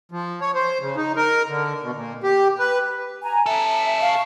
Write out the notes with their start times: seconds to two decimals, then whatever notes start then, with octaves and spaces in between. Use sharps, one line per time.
0.12 F3
0.41 C#5
0.55 C5
0.81 C#3
0.96 D#4
1.16 A#4
1.49 D3
1.82 B2
1.95 A#2
2.23 G4
2.59 B4
3.23 G#5 A#5
3.46 C#4 A4 E5
4.00 F5 C#6